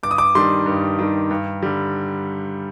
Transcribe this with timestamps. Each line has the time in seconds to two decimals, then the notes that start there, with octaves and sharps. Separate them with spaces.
0.03 G2 D6
0.11 D#6
0.18 D6
0.35 D#3 G3 D4 C6
0.66 G2
0.99 D#3 G3 D4
1.31 G2
1.63 D3 G3